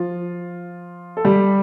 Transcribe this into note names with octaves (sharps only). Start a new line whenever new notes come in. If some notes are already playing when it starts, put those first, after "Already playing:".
Already playing: F3 F4
A4
G3 G4